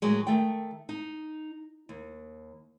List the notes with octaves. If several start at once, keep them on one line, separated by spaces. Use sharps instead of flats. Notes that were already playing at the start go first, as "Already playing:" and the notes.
A2 D#3 F#3 G#3
D#3 A3 G5
D#4
D#2